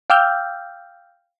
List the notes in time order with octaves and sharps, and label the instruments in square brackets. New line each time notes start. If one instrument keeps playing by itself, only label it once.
[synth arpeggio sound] F5 G5 D6 E6 F6 G6